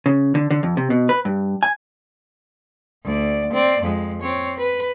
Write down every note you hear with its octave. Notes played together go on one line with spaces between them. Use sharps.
C#3
D3
D3
F2
C3
B2
B4
G2
G#5
D2 D5
C4 D5
F2 G#3
C4 C#5
B4